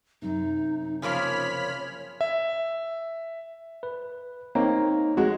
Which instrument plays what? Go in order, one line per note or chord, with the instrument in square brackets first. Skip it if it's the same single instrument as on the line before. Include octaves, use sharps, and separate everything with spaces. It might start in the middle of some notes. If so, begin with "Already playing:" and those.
[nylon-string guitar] F#2 C3 [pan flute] D#4
[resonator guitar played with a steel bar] C#3 F3 A#3 [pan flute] C#5 [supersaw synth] B5 F6 B6
[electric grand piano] E5
[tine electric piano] B4
[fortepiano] A#3 [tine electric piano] C4 D#4 C#5
[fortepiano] G#3 F#4